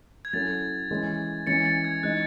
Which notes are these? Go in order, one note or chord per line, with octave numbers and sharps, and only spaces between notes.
G#6
F#3 C#4 E4 A4 A6
E3 G#3 C#4 G#4
E3 G#3 C#4 A6 C#7
A6
G#6
E3 G#3 D#4 F#6